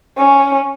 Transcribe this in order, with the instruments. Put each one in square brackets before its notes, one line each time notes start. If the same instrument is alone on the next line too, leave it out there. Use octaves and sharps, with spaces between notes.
[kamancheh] C#4